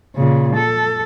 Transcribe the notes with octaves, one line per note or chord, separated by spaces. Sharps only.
A#2 C#3
A4